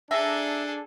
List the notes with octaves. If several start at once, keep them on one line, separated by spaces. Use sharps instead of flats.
D4 G#4 A4 E5 A#5